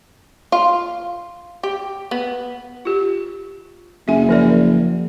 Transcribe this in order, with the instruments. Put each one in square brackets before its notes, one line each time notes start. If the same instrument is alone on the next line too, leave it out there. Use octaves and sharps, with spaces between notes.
[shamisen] F4
G4
B3
[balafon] F4 G4
[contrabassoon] F#1 [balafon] E5 G#5
[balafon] F3 A#4 D5